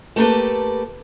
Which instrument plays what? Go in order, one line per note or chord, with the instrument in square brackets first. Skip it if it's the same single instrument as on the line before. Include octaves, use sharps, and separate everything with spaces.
[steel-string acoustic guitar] A3 A#3 G4 A4 B4